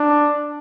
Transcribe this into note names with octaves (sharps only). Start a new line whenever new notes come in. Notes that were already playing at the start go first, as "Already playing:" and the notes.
Already playing: D4